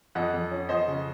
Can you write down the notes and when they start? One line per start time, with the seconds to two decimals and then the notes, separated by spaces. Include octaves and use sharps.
0.15 F2 D#5 F#5
0.34 F2
0.51 C#4
0.69 F2 C5 D#5
0.88 C#3